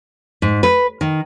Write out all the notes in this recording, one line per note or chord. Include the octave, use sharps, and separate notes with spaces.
G#2
B4
D#3